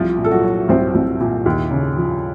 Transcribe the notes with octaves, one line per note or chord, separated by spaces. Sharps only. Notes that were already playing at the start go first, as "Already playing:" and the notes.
Already playing: C2 F3 F4
A#2
A4
F#3 F#4
F#3
C2 C4 C5
C2
A#2
D#2
C#3
F3